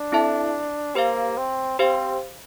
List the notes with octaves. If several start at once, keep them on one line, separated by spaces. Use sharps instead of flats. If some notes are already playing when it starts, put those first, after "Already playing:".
Already playing: D4
C4 E4 A4 E5 A5
A#3 G4 C5 F5
C4
C4 G4 C5 F5